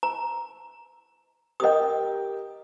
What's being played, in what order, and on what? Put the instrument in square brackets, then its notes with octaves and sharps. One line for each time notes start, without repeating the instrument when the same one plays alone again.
[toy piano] A#5
[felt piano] G4 A#4 G5 [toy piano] D#5 D#6